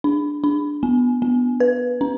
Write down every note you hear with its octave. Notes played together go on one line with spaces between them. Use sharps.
D4
D4
B3
B3
B4
C#4